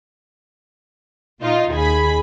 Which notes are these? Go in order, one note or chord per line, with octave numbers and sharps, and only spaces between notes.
A#2 D#4 F4 D#5
D#2 G#4 B5